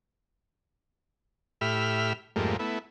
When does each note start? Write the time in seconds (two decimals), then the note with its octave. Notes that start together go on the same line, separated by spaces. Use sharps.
1.61 A2 G4 E5 B5 F6
2.36 F2 G#2 G3 A3 A#3
2.59 A3 B3 E4